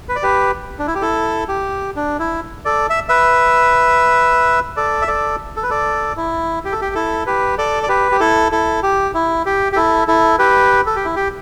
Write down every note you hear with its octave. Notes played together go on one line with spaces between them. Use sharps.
B4
D5
G4 B4
D4
E4
G4
E4 A4
G4
D4
E4
A4 D5
E5
B4 E5
A4 D5
E5
A4 D5
A4
B4
A4 D5
E4
G4
A4
G4
E4 A4
G4 B4
A4 D5
D5
G4 B4
G4
E4 A4
E4 A4
G4
E4
G4
G4
E4 A4
E4 A4
G4 B4
A4
G4
E4
G4